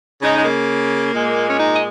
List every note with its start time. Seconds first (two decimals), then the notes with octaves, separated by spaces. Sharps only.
0.22 C#3 G#3 D#4
0.36 G#3
0.45 A#3
1.14 A#2 G#3
1.49 C#4
1.59 D#4
1.74 D#5